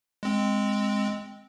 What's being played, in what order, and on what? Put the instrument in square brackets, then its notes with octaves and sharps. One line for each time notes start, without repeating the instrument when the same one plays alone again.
[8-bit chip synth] G#3 C4